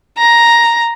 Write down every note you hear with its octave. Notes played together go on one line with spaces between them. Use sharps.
A#5